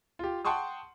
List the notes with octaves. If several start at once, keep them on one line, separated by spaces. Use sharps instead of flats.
F4 G4
F#5 G5 A5 C6 C#6 D#6